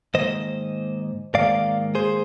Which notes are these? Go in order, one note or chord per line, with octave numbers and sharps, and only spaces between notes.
G#2 D#3 A#3 C5 D#5
G#2 D#3 A#3 D5 F5
G#4 C5